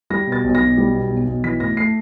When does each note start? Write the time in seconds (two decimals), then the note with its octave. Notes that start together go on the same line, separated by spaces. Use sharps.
0.10 G3 A#6
0.27 B2
0.32 A6
0.44 B1
0.55 A#6
0.60 B1
0.78 G3
0.94 B2
1.10 B1
1.27 B1
1.44 E3 B6
1.60 A2 A#6
1.77 A3 C7